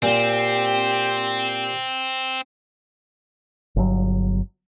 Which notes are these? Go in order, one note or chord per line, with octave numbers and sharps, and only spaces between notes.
A#2 C4 G4
G1 F#3